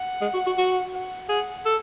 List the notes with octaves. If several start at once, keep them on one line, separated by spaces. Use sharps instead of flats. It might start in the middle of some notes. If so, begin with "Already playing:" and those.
Already playing: F#5
G#3
F#4
F#4
F#4
F#5
G#4 F#5
A4